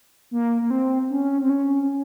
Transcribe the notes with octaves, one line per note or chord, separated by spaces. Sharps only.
A#3
A#3
C4
C#4
C4
C#4